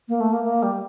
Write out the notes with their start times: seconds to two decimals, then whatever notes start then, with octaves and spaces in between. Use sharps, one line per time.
0.08 A#3
0.20 A3
0.33 A#3
0.44 A#3
0.63 G3